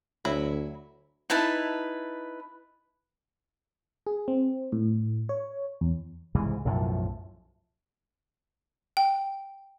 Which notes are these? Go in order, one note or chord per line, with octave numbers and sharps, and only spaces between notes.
D2 F#3 E4 B5
D#4 E4 B4 A5
G#4
C4
A2
C#5
E2
C2 G#2 C#3 E3
B1 F#2 A2 F3
G5